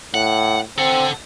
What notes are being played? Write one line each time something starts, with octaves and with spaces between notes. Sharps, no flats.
A2 F#5
C4 A4 F#5